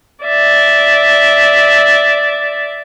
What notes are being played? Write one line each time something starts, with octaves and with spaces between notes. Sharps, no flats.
D5 E5